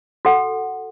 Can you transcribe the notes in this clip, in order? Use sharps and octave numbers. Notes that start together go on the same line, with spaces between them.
F#4 A4 F#5